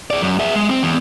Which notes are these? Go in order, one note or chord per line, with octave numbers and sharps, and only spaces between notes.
G#4 D5
F#2
G#4 E5
G#3
C4
E2